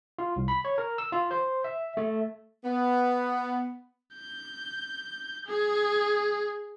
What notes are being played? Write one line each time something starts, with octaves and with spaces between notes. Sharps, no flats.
F4
C2
B5
C#5
A#4
E6
F4
C5
E5
A3
B3
G6
G#4